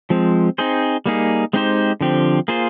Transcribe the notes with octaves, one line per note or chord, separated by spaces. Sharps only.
F3 G#3 C4
C4 D#4 G#4 C5
G3 A#3 D#4 G#4
G#3 C4 D#4 G4 C5
D3 F3 C4 G4
A#3 F4 G#4 C5